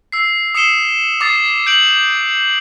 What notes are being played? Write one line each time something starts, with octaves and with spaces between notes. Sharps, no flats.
E6 C7
D#6 C7 C#7 E7 G7
D6 D#6 A6 C7
G6 D7 F#7